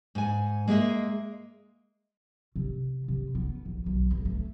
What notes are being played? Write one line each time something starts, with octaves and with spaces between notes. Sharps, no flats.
G#2 G#5
G#3 A#3 G#4 D#5 E5
C3
C3
B3
A#1
B1
G2
A3